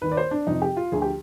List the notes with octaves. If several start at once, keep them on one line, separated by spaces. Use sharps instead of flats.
D#2 D#3 B4
D5
C5
D4
F2 C3 F3 D#4
G4
F4
D2 D3 F3 G#4
G4